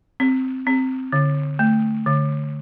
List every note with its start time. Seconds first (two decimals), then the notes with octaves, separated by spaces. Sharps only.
0.20 C4
0.67 C4
1.12 D3
1.59 A3
2.07 D3